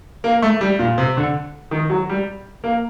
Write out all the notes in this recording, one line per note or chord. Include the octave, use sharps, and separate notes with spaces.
A#3
A3
G3
A#2
C3
D3
D#3
F#3
G3
A#3